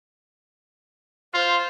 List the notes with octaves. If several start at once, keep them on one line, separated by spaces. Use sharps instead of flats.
F4 C5